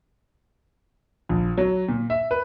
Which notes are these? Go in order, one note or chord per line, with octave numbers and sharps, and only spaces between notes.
A#1
F#3
A#2
E5
B4